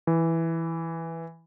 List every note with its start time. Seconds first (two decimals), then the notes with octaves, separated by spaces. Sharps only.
0.07 E3